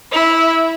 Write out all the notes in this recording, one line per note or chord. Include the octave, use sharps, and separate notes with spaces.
E4